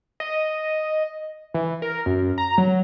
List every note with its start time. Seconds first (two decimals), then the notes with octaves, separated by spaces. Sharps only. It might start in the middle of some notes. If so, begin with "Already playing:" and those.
0.20 D#5
1.54 E3
1.82 A#4
2.06 F#2
2.38 A#5
2.58 F#3